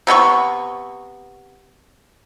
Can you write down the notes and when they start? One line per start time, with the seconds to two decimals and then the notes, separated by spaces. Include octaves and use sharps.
0.07 C3 B3 D#4 C#6